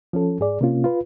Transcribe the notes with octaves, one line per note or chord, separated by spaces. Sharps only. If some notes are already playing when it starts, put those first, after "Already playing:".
F3 C#4 A4
G#2 G#4 D5
C3 A#3 C#4 F4
F4 B4